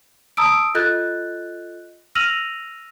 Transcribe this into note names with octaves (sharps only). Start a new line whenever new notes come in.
A5 A#5 D#6 E6 D7
F4 A4 D#5 F#6 G6 A6
E6 F6 A#6 D#7 F7 F#7